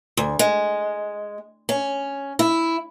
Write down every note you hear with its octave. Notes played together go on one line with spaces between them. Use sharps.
D2
G#3
C#4
E4